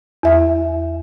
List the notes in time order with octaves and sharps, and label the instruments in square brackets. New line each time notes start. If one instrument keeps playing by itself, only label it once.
[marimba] E2 E5